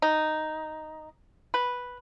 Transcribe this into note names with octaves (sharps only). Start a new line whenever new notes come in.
D#4
B4